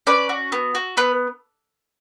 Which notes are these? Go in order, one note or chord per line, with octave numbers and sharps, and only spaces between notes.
C#4 B4 D5
F#4
B3
F#4
B3 B4